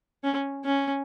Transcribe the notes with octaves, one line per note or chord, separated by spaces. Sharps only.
C#4
C#4